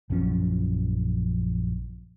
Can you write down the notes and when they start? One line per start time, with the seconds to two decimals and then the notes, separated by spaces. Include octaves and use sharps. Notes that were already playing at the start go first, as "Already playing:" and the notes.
0.10 A#1 F#2 F3 C#4